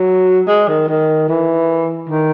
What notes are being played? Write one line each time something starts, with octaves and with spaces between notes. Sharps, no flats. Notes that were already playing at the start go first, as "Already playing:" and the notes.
Already playing: F#3
G#3
D#3
D#3
E3
D#3